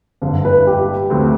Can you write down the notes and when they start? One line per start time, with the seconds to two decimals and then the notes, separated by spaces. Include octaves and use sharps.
0.22 G1 G2 D3
0.45 B4
0.67 G4
1.10 D2 D3 A3 C4